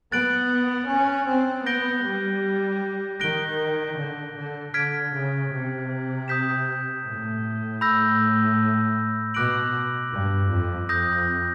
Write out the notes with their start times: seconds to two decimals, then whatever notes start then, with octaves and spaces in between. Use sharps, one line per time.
0.12 B3 F#6 A6 D7 F#7
0.89 C#4
1.27 C4
1.66 B3 G6 A#6 D7 G7
2.04 G3
3.20 D#3 F#6 A#6 D7 G7
3.96 D3
4.35 D3
4.73 D3 F6 G#6 B6 D7
5.13 C#3
5.51 C3
6.28 D#6 G6 B6 E7
7.04 A2
7.81 B5 E6 G6 A#6
9.34 B2 D6 F#6 A#6 D7 F#7
10.12 G2
10.50 F2
10.88 F2 D#6 G6 A#6